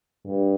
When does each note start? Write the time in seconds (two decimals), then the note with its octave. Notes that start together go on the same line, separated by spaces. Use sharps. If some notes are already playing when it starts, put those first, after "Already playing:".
0.25 G2